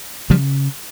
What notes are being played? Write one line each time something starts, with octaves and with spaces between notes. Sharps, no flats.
C#3 F3 G3